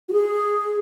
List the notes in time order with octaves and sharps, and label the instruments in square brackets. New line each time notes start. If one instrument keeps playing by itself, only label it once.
[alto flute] F#4
G#4